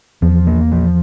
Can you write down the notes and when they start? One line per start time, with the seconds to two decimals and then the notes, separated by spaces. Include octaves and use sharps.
0.22 E2 F3
0.47 A#3
0.72 F3